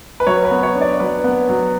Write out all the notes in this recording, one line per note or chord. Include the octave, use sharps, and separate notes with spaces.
B4
F#3 C#5
B4
B3
C#5
D4
D5
F#3 B4
B3
F#3